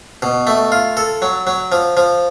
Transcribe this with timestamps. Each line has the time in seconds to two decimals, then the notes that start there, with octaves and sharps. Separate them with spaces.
0.22 B2
0.47 A3
0.72 F4
0.97 A4
1.22 F#3
1.47 F#3
1.72 F3
1.97 F3